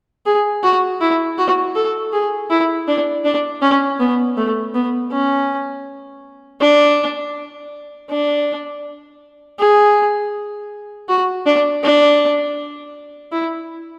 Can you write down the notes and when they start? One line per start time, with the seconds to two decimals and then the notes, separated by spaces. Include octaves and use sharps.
0.26 G#4
0.63 F#4
1.01 E4
1.38 F#4
1.76 A4
2.13 G#4
2.50 E4
2.88 D4
3.25 D4
3.62 C#4
4.00 B3
4.37 A3
4.74 B3
5.11 C#4
6.61 D4
8.10 D4
9.59 G#4
11.09 F#4
11.46 D4
11.83 D4
13.32 E4